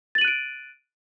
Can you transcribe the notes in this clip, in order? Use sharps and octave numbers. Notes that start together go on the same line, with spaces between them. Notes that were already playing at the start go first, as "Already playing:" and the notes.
F#6 A6 D7 D#7 F#7